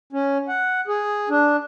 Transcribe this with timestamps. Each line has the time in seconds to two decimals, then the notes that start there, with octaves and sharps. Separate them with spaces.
0.13 C#4
0.48 F#5
0.88 G#4
1.30 D4